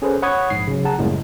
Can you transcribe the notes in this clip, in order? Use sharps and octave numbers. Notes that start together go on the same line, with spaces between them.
C#4 G#4 A4 B4 C5
C#5 F#5 B5 C#6 D#6 G#6
A#1 G#2 C7
C#3 F#3
G#4 F#5 A5 A#5
F#2 A2 C#3 G3 G#3 A#3